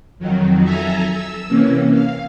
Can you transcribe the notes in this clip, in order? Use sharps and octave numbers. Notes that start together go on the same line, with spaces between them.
F2 D#3 F#3
A4 E5 G#5 A#5
E6
C3 E3 A#3 C#4
F5